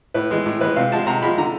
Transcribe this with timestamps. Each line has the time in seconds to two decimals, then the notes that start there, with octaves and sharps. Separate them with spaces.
0.14 A2 B4
0.31 E3 G#3
0.46 A2
0.61 E3 G#3 B4
0.76 C3 F5
0.91 F3 G#3 A5
1.06 C3 A#5
1.22 F3 G#3 B5
1.38 D3 A#5